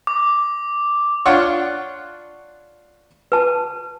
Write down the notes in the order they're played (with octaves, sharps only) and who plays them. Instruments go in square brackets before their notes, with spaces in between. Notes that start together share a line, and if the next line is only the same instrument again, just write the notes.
[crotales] D6
[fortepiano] D4 F4 C#5 F#5 C6 C#6
[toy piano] B4 A5